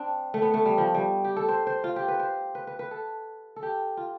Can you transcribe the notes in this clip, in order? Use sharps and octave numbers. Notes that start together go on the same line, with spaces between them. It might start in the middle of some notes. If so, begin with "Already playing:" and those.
Already playing: C4 D4
A3
B3
A3
G3
F3
G3
G4
A4
C5
C5
F4
G4
B4
C5
B4
B4
B4
A4
A4
G4
F4